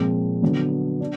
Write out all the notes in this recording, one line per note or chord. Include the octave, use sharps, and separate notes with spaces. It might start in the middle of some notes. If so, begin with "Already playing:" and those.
Already playing: A#2 F3 G#3 C4
D3 F#3 B3
D4